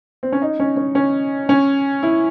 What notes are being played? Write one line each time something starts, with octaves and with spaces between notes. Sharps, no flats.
C4
C#4
D#4
C#4
C#4
C#4
C#4
E4